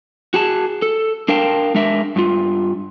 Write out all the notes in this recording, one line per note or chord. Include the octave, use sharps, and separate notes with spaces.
F#4 G#4 A5
A4
D4 A#4 F5 G5 A5
G#3 D4 A#4 E5
G2 F4